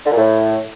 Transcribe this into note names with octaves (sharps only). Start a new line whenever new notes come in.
D3
A#2
A2